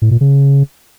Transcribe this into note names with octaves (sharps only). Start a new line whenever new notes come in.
A2
A#2
C#3